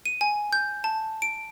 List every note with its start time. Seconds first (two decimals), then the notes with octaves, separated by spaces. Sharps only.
0.06 D#7
0.21 G#5
0.53 G6
0.84 A5
1.22 D7